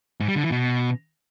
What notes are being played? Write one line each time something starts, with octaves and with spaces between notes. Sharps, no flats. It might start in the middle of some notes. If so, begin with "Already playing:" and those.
G#2
G3
D3
E3
B2